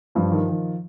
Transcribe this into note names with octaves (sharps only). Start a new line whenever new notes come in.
G2 F3
D#3
D#3